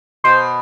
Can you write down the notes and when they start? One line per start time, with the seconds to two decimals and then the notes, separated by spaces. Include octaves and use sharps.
0.24 B2 C5